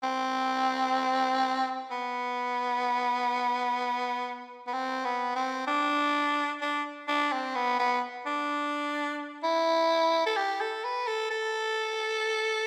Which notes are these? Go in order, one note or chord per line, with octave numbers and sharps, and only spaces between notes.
C4
B3
B3
C4
B3
C4
D4
D4
D4
C4
B3
B3
D4
E4
A4
G4
A4
B4
A4
A4